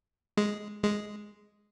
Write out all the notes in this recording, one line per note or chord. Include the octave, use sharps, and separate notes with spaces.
G#3
G#3